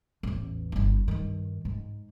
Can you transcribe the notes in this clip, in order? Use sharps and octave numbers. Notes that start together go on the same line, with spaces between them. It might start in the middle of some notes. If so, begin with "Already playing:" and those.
A1 E2
G1 E4
G2 D#3
G#2